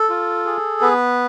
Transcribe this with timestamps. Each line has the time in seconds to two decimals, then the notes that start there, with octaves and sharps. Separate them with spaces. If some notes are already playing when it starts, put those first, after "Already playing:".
Already playing: A4
0.09 F4
0.46 G#4
0.81 B3 B4